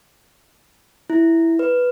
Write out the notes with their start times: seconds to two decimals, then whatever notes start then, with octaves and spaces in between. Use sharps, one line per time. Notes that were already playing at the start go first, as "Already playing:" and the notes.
1.10 E4
1.59 B4